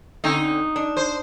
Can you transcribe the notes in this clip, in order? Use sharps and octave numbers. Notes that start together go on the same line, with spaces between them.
D3 C4 C#4 D#4
D4
C5